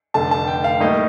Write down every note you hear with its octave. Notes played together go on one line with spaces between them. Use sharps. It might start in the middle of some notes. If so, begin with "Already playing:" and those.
F1 F2 D3 A3 A5
A5
G5
F5
A2 G3 A#3 D#4 D#5